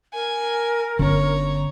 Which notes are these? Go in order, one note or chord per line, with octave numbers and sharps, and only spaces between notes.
A#4 G#5
G1 D3 C#4 C#5 A#5